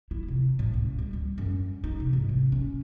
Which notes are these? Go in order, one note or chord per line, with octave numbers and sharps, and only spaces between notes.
E4
C3
A2
C#2
G3
G3
F#2
D#4
C3
G#2
C3
C#4